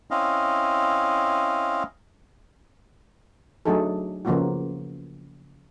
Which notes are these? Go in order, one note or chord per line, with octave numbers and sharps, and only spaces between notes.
C4 C#4 E4 D#5 F5
F#3 A3 D4 D#4 G#4 A4
C#3 F3 A#3 B3 F4 F#4